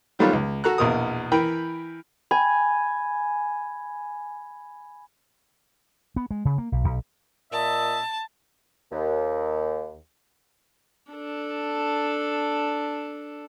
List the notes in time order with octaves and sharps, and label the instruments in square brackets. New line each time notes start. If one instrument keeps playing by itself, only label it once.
[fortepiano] D#3 F#3 G3 A3 B3 F4
C#2
F#4 A4 A#5 F#6
A#1 E2 B2 A#4 D#6
E3 A#4 G5 B5
[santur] G#5 [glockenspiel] B5 G#6
[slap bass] B3
G#3
C#3
A#3
B1
B1
[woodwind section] A#2 D#5 E5 [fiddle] A5
[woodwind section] D#2
[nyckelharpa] D4 A4